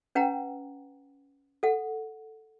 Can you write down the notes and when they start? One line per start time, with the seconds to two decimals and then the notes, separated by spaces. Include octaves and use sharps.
0.15 C#4 B4 F#5 G5 A#5
1.63 A4 F#5